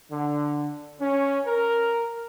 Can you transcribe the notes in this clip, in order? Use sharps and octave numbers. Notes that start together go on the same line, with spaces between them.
D3
C#4
A#4